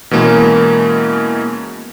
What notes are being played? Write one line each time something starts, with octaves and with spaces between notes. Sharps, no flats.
B2 E3 G#3 A#3 C#4